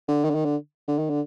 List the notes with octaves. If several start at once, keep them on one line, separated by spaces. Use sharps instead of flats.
D3
D#3
D3
D#3
D3
D3
D#3
D3